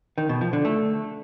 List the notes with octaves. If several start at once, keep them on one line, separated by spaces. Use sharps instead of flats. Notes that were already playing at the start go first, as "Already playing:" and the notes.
D#3
B2
F3
D3
A3